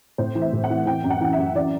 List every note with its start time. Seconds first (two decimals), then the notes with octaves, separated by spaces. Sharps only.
0.18 A2 C5
0.35 E3
0.41 E5
0.53 A2
0.64 F#5
0.70 E3
0.86 E3 G5
1.04 F#2
1.10 F#5
1.21 E3
1.33 E5
1.38 F#2
1.55 E3 D5